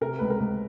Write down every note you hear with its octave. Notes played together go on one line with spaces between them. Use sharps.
C3 A#4
C#2 B4
A#4
C#2